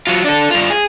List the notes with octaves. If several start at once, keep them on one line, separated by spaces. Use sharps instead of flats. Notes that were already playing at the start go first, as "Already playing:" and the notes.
F#3 F4
D4 A4
G2 F4
G#4